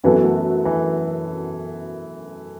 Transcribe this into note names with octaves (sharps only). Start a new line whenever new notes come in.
F#2 E3 F#3 B3 F#4 A4
A3
E3